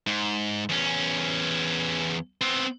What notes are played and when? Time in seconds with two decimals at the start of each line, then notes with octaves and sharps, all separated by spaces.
0.07 G#2
0.69 E2 C#4
2.41 B3 C4